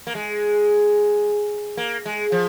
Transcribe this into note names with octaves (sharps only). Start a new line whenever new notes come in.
A#3
G#3
A#3
G#3
F3